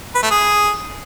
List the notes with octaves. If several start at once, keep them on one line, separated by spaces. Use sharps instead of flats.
B4
A3
G#4